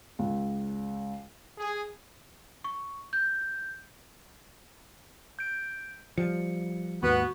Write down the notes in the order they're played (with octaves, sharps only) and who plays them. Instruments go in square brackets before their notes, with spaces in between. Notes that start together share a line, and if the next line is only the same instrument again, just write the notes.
[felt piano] C#2
[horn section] G#4
[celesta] C#6
G6
[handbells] G6 D7
[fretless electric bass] F3 G3 [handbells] C#7
[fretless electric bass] D#2 G#2 [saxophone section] B3 [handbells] F#4